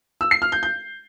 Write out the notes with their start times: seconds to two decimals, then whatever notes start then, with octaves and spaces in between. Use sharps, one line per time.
0.21 E6
0.31 C7
0.42 F6
0.52 G6
0.63 G6